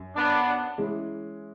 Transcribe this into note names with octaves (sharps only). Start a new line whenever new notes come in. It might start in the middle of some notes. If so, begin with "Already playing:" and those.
Already playing: F#2
B3 D4
E3 G#3 C#4